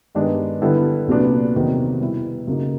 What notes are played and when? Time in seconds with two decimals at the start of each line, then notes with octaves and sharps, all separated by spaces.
0.15 G2 D#3 G#3 B3 D4
0.62 D3 G3 B3 E4 A4
1.08 C2 A#2 F#3 B3 D4
1.55 E2 C3 D#3 F#3
2.01 B2 G3 B3 E4
2.47 F#2 C#3 F#3 A#3 D#4